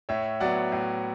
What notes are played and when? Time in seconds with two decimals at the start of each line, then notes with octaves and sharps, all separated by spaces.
0.09 A2 C#5 E5
0.40 F#3 B3 D5 F#5
0.72 A2